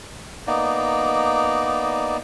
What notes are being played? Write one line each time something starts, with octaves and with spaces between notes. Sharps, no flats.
A#3 B3 D#4 D5